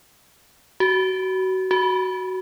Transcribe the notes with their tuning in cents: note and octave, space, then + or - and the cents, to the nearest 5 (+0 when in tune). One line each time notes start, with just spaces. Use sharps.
F#4 +25
F#4 +10